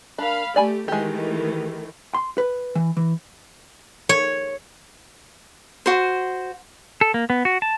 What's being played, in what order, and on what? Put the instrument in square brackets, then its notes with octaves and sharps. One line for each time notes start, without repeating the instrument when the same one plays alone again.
[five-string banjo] D4 A#4 [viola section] F5 B5
[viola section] A3 G4 [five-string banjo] D5 G#5 B5
[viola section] D#3 E3 A3 [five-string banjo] G#3 G4
[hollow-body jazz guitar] C6
B4
E3
E3
[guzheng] C#5
[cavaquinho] F#4 C5
[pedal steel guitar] A4
A#3
B3
F#4
A5